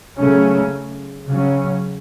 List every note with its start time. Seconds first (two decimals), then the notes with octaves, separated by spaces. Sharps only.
0.17 C#3 F#3 A3 C#4
1.26 C#3 F#3 C#4